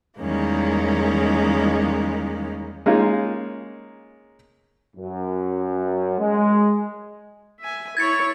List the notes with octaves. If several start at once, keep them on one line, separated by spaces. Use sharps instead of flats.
E2 D#3 G3 G#3 A#3 C#4
G#3 A#3 C#4 D#4 F4
F#2
G#3
E5 G#5
E4 C#5 G#6 A6 C#7